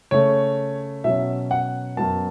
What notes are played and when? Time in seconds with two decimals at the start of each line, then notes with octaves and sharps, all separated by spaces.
0.11 C#3 A3 C#4 C#5
1.04 B2 F#3 C#4 E5
1.51 F#5
1.97 F#2 F#3 B3 A5